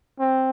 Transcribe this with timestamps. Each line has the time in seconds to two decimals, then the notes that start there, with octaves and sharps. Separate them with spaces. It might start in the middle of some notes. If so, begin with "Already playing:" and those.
0.19 C4